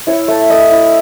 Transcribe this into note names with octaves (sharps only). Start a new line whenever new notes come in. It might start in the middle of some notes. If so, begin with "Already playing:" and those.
E4 C#5
A3
A3 D#5
E4